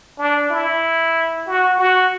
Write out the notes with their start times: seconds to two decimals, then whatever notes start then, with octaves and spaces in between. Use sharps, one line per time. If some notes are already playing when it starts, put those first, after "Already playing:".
0.18 D4
0.50 E4
1.47 F#4
1.78 F#4